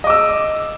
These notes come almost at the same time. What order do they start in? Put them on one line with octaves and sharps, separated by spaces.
D#5 D6 E6